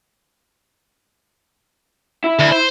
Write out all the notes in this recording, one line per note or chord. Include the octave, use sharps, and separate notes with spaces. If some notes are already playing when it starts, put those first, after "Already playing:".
E4
D2
C5